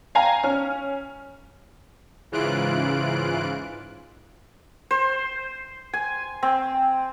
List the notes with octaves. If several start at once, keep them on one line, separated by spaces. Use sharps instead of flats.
F5 G5 G#5 A#5
C#4 F6
G#2 C#3 E3 F4 F#6 D7
C5
G#5
C4